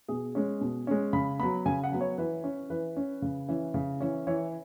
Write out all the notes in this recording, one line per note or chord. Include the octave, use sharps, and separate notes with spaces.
B2 G#4
G#3 C#4
B2
G#3 C#4
C#3 B5
F#3 B3 B5
C#3 G#5
F#5
F#3 B3
C#5
E3 B4
C#4
E3 B4
C#4
C#3
E3 C#4
C#3
E3 C#4
E3 C#5